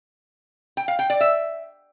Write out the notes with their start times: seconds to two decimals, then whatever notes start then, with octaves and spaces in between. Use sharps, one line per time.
0.77 G5
0.88 F5
0.99 G5
1.10 D5
1.21 E5